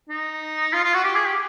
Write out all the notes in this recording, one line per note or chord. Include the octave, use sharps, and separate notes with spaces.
D#4
F4
F4
F#4
G4
G#4
G4